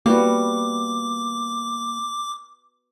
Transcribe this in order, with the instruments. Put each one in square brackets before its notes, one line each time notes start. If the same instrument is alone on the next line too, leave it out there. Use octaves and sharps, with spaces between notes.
[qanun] G3 B3 F#4 [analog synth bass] A#3 [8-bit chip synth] D6